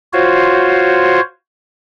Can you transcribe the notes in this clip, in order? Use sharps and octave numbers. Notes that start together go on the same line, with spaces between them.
F4 F#4 C5 C#5